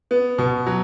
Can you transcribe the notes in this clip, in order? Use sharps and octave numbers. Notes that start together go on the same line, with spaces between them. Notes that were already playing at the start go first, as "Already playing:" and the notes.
B3
B2
F#3